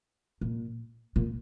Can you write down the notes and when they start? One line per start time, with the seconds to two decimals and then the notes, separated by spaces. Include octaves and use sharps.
0.41 A#2
1.16 A#2